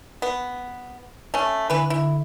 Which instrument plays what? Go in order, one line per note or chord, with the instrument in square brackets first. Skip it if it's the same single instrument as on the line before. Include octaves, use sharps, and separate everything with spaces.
[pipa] B3
A3 C#4
[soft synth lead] D3 [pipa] E3 B4
[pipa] E4